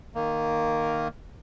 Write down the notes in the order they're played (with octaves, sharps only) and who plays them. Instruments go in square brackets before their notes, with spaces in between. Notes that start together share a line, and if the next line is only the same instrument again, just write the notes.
[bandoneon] D#3 A#3